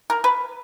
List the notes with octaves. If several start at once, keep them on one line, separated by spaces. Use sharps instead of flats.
A#4
B4